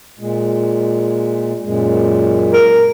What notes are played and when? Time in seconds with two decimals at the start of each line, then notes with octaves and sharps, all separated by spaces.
0.19 A#2 G#3
1.64 F#2 A#2 G#3
2.53 A#4